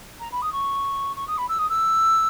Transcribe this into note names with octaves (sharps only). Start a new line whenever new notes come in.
A#5
B5
D#6
C#6
C#6
D#6
B5
E6
D#6
E6